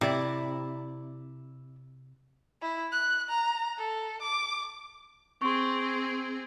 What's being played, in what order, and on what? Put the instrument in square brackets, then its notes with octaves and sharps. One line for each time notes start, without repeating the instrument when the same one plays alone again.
[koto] C3 [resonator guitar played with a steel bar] E4 D5
[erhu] E4
F#6
A#5
A4
D6
[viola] C4 G#4 [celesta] C6 C#6